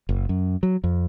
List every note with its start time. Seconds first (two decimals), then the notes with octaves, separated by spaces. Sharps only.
0.09 F#1
0.29 F#2
0.63 F#3
0.84 F2